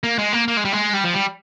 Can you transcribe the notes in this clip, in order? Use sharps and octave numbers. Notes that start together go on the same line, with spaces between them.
A#3
G#3
A#3
A#3
G#3
G3
G#3
G3
F3
G3